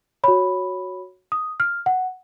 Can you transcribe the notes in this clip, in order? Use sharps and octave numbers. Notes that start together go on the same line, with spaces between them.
F#4 C#5 B5
D#6
F6
F#5